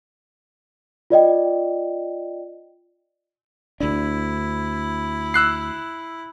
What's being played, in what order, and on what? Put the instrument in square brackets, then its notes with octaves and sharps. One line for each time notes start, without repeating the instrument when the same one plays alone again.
[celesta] F4 D5 D#5 G5
[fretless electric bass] D2 D4 [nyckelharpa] E4
[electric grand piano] E6 F#6 C7